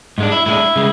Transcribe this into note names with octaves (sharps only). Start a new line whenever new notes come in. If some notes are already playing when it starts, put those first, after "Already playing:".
G#2 G#3 D4
E4
A2 G#3 D4 E4
C#3 G#3